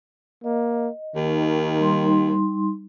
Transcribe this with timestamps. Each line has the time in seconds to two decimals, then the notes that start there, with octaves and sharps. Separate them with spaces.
0.44 A#3 D#5
1.16 D#2 D#3
1.80 G3 D#4 C6